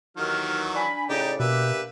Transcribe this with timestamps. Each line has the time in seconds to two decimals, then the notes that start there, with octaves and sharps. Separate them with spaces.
0.17 D#2 D#3 E3 F#3 F6
0.75 D4 G#5 B5
1.09 A2 C#3 D#4 G4 D5
1.40 B2 A#3 D4 G4 B4 E5